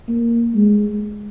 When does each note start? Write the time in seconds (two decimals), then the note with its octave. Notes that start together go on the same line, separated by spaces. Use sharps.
0.08 A#3
0.55 G#3